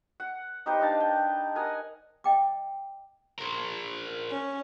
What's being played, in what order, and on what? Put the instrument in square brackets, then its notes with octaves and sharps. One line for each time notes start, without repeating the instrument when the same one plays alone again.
[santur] F#5
D#4 G4 B4 C5
D4 D#4 F5 A5
G5
A#4 F#5 G#5 D#6
[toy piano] D#5 G5 D6
[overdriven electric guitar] A#4 C5
[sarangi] C#4